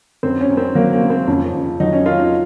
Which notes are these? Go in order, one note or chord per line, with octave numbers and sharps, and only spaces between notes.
F#2 C4
C#4
F#2
C4
F#3 A#3
A#3
C#3
C4
F2 C#4
F2
F#3 D#4
C#4
D#3 F4
D#4